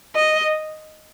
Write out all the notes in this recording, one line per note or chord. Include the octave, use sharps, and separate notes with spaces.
D#5